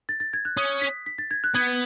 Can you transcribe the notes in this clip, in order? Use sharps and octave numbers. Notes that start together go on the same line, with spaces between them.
A6
A6
G#6
F#6
C#4 D#6
B6
B6
A6
G#6
F#6
B3 G#6